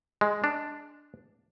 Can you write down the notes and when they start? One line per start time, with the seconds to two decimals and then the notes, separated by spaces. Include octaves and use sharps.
0.21 G#3
0.44 D4